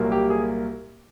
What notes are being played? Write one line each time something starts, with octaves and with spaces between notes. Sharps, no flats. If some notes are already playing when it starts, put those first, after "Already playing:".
Already playing: C2 A#2 F#3 A#3
G4
G#4